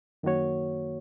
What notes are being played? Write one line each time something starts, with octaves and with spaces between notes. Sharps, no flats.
F#2 D#3 A#3 F#4 C#5